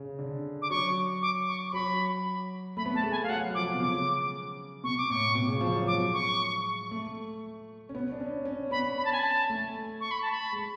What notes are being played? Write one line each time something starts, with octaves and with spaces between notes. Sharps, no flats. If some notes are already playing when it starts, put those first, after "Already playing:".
Already playing: C#3
D3
D6
F#3 C#6
D6
C#6
C#6
F#3 B5
A3 B5
B3
A3 A5
G#3
G#5
F5
F#3 F#5
F3 D6
B2
C#3 D6
B2 C#6
D6
A2 C#6
B2
C#3
F3
F#3
G#3 D6
C#6
A3
C#4
B3
D4
C#4
C#4
B3 B5
B5
A5
G#5
A5
A3
C#6
B5
A5
B5
G#3